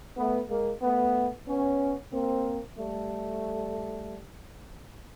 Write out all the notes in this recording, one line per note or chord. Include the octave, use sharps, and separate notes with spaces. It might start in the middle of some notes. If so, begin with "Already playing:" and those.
A3 B3
G#3 A#3
A3 B3
B3 C#4
A#3 C4
G3 A3